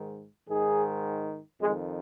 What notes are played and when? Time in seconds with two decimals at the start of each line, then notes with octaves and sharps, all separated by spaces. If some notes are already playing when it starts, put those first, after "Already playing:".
Already playing: G#2 D#3
0.48 G#2 D#3 G#4
1.61 F2 G#3
1.66 D#3